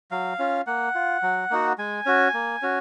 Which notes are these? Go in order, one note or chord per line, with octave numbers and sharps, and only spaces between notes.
F#3 F5
C#4 F4
A#3 F#5
F4
F#3
A#3 D#4 F#4
G#3 G#5
C#4 F#4
A#3
C#4 F#4